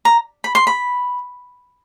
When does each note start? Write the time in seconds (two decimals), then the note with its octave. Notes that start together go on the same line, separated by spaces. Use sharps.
0.05 A#5
0.44 B5
0.55 C6
0.67 B5